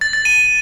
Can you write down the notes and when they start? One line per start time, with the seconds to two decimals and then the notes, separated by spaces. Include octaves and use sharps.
0.01 A6
0.13 A6
0.25 D#7